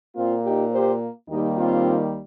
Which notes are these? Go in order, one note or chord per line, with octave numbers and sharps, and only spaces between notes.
A#2 A#3 C4 F4
D#4 G4
G4 C5
D#2 D#3 G3 A#3 D#4 G4
C4 F4